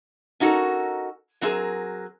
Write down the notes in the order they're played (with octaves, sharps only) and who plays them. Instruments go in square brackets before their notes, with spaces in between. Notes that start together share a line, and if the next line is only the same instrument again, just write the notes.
[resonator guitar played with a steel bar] C#4 D#4 F#4 G4 A4 A#4
F#3 C4 D#4 F4 G#4 A#4